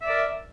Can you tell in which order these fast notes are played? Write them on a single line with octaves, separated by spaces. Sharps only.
E5 D5 A#4